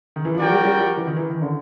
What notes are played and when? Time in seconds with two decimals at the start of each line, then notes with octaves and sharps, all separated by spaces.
0.16 D#3
0.25 E3
0.35 F3
0.39 F#3 F#4 A#4 D5 G5
0.52 G3
0.65 G3
0.78 F3
0.97 E3
1.07 D#3
1.17 E3
1.30 D#3
1.42 D3